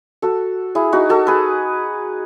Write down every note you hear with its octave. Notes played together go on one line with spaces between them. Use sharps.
F#4 A4
E4 G#4
D#4 F#4
F#4 A4
G#4 B4